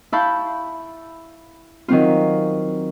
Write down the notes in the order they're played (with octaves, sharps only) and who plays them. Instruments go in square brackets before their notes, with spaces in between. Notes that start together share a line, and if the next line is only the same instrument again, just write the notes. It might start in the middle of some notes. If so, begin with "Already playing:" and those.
[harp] E4 F5 A5 B5 C#6 G6
D#3 F#3 C4 F4